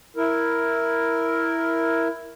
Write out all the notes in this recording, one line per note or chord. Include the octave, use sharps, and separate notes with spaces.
E4 A#4